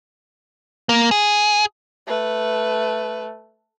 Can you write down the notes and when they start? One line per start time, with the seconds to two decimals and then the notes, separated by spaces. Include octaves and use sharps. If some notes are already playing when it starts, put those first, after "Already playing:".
0.89 A#3
1.11 G#4
2.07 A3 B4